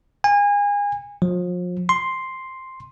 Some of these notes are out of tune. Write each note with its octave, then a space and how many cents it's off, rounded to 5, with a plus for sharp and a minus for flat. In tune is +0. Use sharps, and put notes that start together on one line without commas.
G#5 -30
F3 +35
C6 +5